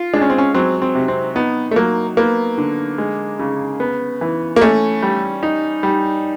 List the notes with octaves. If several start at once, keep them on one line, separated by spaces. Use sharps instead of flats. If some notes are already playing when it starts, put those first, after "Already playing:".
Already playing: F4
G#3 D4
C#4
C4
C#4
F#3 C4
C4
C3
C4
B3 D#4
A3
F#3 A#3
A#3 B3
D3
G#3
C#3
B3
E3
A#3
A3 C#4
G3
D#4
G3